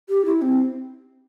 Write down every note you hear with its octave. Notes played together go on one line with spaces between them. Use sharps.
G4
E4
C4